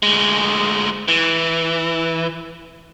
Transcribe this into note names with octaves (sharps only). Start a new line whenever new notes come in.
D2 G#3
E3